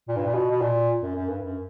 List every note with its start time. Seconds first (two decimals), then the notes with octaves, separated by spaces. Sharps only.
0.08 A#2
0.16 G2
0.26 A#2
0.34 B2
0.51 B2
0.61 A#2
1.02 F#2
1.16 F#2
1.29 G2
1.43 F#2